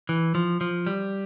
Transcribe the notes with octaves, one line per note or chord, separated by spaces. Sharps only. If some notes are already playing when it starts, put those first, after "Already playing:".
E3
F3
F3
G3